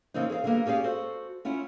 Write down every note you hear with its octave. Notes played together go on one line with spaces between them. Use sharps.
C#3 E3 A#3 C4 D#4
G#4 A#4 C5 F5
D3 G3 A#3 B3
C#4 G4 G#4 D5 F5
F#4 A4 C5
C#4 E4 F4 F#5